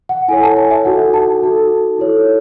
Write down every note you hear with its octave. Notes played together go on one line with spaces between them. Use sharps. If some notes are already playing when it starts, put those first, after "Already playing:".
F#5
E4 A4 C#5 G#5
A5
G#5
E5
D#4 F#4 A4 F#5
A5
D#4 F#4 A4
E4 A4 C#5